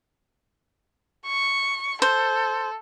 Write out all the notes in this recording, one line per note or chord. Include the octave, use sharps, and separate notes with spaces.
C#6
A4 C5